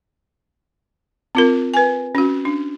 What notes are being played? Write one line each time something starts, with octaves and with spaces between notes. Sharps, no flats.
C4 F4 A#4
B4 G#5
C#4 F#4
D4